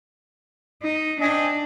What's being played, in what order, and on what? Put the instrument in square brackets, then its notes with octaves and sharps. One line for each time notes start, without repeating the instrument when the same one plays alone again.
[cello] D#4
[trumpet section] C4 D#5 G#5 [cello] D4